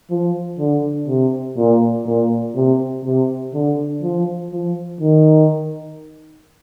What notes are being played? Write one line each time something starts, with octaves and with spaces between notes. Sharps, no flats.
F3
D3
C3
A#2
A#2
C3
C3
D3
F3
F3
D#3